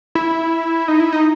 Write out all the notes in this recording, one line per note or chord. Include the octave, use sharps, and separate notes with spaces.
E4
D#4
E4
D#4